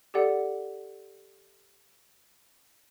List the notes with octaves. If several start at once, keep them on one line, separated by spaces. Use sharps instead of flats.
G4 A4 D5 F#5